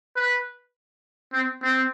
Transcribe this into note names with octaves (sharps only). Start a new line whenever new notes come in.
B4
C4
C4